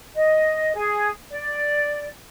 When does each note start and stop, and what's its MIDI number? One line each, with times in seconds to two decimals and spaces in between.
0.14 0.75 75
0.75 1.08 68
1.30 2.06 74